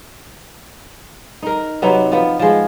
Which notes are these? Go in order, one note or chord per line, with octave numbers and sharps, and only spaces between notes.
D#4 A#4
C3 F#3 B3 D#4
F3 B3
F3 G#3